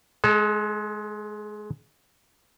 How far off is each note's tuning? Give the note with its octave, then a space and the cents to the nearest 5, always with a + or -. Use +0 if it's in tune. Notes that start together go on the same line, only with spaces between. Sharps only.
G#3 +20 A4 -20